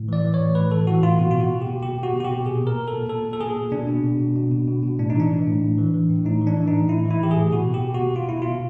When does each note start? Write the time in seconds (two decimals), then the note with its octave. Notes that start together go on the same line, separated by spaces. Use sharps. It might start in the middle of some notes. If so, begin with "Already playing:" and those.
Already playing: A2
0.08 E3 D5
0.24 E3
0.34 C#5
0.40 A2
0.55 A2 B4
0.71 E3 A4
0.87 E3 F#4
1.03 A2 F4
1.19 B2 F#4
1.31 F4
1.35 B2 F#4
1.51 B2
1.62 B2 G4
1.82 B2 G4
1.98 B2 F#4
2.13 B2
2.20 F#4
2.24 G4
2.30 B2
2.46 A#2 G#4
2.62 A#2
2.67 A#4
2.77 A#2
2.88 A4
2.93 A#2
3.09 A#2 A4
3.25 A#2
3.33 A4
3.40 A#2 G#4
3.56 A#2
3.72 B2 D4
3.88 B2
4.03 B2
4.20 B2
4.36 B2
4.51 B2
4.68 B2
4.83 B2
4.99 A2 D4
5.10 E3 D#4
5.20 D4
5.30 E3
5.47 A2
5.62 A2
5.78 E3
5.94 E3
6.10 A2
6.26 A2 D#4
6.42 E3
6.47 D4
6.57 E3
6.68 D#4
6.73 A2
6.89 A2 E4
7.05 E3
7.11 E4
7.20 E3 G4
7.31 G#4
7.37 A2
7.52 B2 F#4
7.69 B2
7.74 G4
7.84 B2
7.94 F#4
8.00 B2
8.16 B2 F4
8.29 B2 E4
8.42 F4
8.48 B2